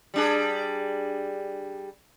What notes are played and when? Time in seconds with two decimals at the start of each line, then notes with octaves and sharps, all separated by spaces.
0.14 G3 D4 G#4